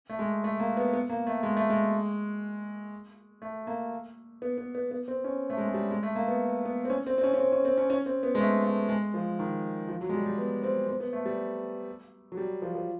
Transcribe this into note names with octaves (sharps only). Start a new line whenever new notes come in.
A3
G#3
A3
A#3
B3
B3
A#3
A3
G#3
A3
G#3
A3
A#3
B3
B3
B3
B3
C4
C#4
A3
G#3
G#3
G3
G#3
A3
A#3
B3
B3
C4
C#4
C4
C4
C#4
C#4
C4
C#4
C4
C#4
C#4
C4
B3
G#3
A3
A3
G#3
F3
D#3
F3
F#3
G#3
G3
G3
B3
C4
C4
B3
A3
G3
F#3
G3
F3
F3